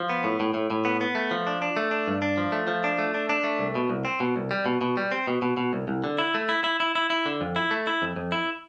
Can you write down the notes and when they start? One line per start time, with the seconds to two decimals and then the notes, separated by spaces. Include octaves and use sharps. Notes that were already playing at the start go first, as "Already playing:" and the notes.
Already playing: F3
0.09 B3
0.24 A2
0.40 A2
0.54 A2
0.70 A2
0.85 B3
1.01 B3
1.15 A3
1.31 F3
1.47 D4
1.62 D4
1.77 A3
1.91 D4
2.08 G2
2.22 D4
2.38 F3
2.52 A3
2.67 F3
2.84 D4
2.99 A3
3.14 D4
3.29 D4
3.44 A3
3.59 C2
3.75 B2
3.89 C2
4.05 C4
4.20 B2
4.36 C2
4.51 G3
4.66 B2
4.81 B2
4.97 G3
5.12 C4
5.27 B2
5.42 B2
5.57 B2
5.73 C2
5.88 C2
6.04 D3
6.18 E4
6.34 A3
6.49 E4
6.64 E4
6.80 E4
6.95 E4
7.10 E4
7.26 D3
7.41 F2
7.56 E4
7.71 A3
7.87 E4
8.02 F2
8.16 F2
8.32 E4